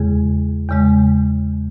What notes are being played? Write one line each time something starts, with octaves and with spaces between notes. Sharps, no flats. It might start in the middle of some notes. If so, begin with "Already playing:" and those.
Already playing: E2 C#3 G#3 G#4
E2 C#3 G#3